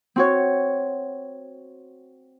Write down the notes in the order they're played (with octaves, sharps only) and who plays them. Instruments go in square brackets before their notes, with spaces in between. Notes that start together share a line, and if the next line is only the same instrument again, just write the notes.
[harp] C4 F#4 C#5